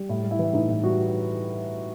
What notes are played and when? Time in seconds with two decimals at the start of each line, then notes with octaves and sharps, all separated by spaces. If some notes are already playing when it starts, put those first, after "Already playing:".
Already playing: G3
0.09 A2 E4
0.24 G3
0.31 E4
0.39 E3
0.53 A2 D#4
0.69 A2
0.83 G3 F#4